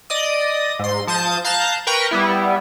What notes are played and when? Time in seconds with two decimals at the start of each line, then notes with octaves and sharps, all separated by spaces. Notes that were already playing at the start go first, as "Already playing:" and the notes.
0.10 D5 D#5 D#6
0.79 G#2 C6
1.07 F3 A5 D#6 G6
1.45 F5 A5 A#5 F#6 G6
1.87 A#4 B4 G5 A#5 C#6
2.11 G3 B3 E4